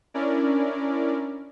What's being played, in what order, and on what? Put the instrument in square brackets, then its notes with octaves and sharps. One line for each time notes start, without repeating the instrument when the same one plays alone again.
[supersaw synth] C#4 D4 E4 A#4 D5